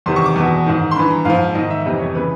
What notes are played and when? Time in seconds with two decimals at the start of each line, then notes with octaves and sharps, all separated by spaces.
0.06 E2 C3 D#3 C6
0.16 C#6
0.26 D6
0.36 E2 B2
0.66 G#2 D#3
0.91 C6
0.96 G2 E3 B5
1.10 A#5
1.25 G#2 F3 F5
1.55 G#2 D#3 D#5
1.70 E5
1.85 F2 C3 E3 D#5
2.00 C#5
2.15 C#3 E3 B4